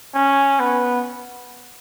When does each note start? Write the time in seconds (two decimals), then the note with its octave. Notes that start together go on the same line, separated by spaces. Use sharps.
0.15 C#4
0.60 B3